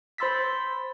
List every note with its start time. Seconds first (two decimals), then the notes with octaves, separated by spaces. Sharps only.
0.18 C5 B5 C6 E6 A6 B6